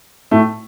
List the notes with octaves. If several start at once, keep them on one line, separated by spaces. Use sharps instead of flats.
A2 A3